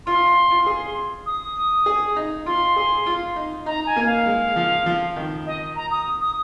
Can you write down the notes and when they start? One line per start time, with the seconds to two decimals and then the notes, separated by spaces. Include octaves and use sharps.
0.06 F4 C6
0.51 F4
0.66 G#4
1.26 D#6
1.86 G#4
2.16 D#4
2.46 F4 C6
2.76 G#4
3.06 F4
3.36 D#4
3.66 D#4 A#5
3.86 G#5
3.96 A#3
4.06 F5
4.26 G#3
4.56 F3
4.86 F3
5.16 D#3
5.46 D#5
5.76 A#5
5.91 D#6
6.21 D#6